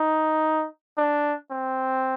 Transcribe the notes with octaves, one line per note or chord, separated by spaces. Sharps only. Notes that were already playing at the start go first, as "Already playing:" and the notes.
Already playing: D#4
D4
C4